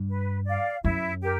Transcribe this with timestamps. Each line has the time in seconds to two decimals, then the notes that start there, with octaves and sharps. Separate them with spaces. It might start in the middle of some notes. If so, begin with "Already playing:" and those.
Already playing: G2
0.09 B4
0.46 D5 F5
0.84 F#2 E4
1.21 G4 A#4